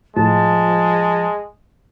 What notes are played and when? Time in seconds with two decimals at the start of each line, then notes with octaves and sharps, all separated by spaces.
0.17 A2 F3 G#3 A5